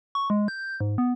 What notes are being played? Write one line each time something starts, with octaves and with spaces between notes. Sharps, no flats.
C#6
G#3
G6
G#2
B3